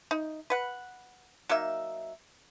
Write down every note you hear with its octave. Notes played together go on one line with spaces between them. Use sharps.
D#4
B4 F#5
F#3 A#3 D#4 E5